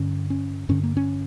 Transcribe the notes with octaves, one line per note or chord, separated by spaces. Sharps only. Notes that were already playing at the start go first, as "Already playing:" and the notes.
Already playing: G2 D3 C#4
C#4
G2 D3 C#4
A#3
C#4